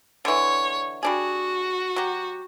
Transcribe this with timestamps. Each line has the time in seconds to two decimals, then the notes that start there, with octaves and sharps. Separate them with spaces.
0.25 D3 E3 C#5
1.03 G3 D4 F#4 G#4
1.96 F#3 G4